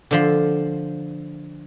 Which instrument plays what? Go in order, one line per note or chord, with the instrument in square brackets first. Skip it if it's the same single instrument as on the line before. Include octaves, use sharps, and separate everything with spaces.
[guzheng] D3 F3 C6